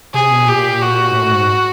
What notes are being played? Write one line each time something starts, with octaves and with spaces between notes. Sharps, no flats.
C3 G#4
B2
A#2 G4
F#4
G#2
A2
G#2